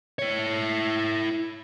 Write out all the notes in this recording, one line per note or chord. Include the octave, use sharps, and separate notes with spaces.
E4 C#5